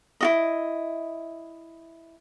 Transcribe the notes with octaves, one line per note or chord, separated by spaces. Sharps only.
E4 F#4 D#5